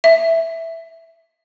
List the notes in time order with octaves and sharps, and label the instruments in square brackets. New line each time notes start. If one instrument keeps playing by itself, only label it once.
[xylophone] E5